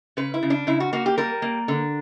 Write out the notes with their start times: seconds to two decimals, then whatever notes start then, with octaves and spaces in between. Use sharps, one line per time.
0.17 C#3 B4
0.34 E4
0.43 C#3
0.50 D4
0.67 C#3 E4
0.80 F#4
0.93 A#3 F#4
1.06 G4
1.18 G3 A#4
1.42 A#3
1.68 D3